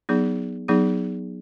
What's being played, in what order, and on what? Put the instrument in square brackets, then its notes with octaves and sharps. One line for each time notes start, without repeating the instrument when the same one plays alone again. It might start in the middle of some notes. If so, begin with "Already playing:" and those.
[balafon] F#3 B3 D#4 G#4
F#3 B3 D#4 G#4